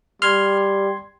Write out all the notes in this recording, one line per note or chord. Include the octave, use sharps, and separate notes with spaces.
G3 C6 F6 G#6